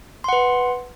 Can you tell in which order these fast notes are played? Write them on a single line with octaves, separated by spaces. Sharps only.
C6 F#5 B4